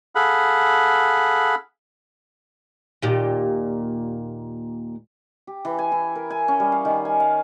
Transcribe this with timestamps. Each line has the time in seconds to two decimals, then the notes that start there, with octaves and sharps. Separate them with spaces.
0.15 G#4 A4 F5 F#5 B5
3.02 D#2 A#2 G4
5.47 G4
5.65 E3
5.79 G#5
5.92 E4
6.15 A#4
6.30 G#5
6.48 C#4
6.60 G3
6.72 F5
6.85 D#3
7.05 G#5
7.20 F5